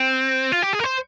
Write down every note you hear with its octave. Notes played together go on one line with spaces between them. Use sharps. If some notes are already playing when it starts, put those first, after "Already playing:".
Already playing: C4
F4
G4
G#4
A#4
C5